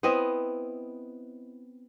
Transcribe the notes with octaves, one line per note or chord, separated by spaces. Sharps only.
B3 C4 E4 D#5